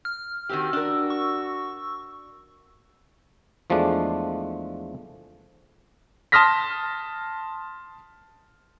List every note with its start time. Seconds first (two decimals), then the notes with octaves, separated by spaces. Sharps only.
0.05 F6
0.49 D#3 C4 F#4 G4 E6
0.73 D4 A#4
1.10 C#6
3.70 E2 F3 G#3 A3 D4
6.32 A5 C6 D#6 F6 A#6 B6